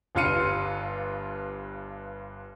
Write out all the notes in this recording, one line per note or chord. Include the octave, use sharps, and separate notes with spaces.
G1 G2 F4 F6 C#7 D#7